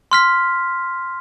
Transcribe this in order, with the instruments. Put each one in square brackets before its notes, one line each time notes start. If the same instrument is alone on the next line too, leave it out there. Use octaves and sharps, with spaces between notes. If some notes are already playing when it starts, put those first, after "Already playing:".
[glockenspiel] C6 F6 B6